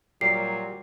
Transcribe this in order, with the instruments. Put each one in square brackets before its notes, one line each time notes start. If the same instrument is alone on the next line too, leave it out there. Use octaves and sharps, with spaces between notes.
[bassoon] A#2 [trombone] F#3 [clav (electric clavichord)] G3 G4 [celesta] C7